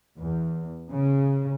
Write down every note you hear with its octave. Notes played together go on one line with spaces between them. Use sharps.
E2
C#3